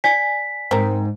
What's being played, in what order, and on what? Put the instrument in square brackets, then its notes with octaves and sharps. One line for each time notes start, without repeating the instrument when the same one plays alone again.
[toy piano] D5 G#5 [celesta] B6
[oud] G#2 [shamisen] C4 A#4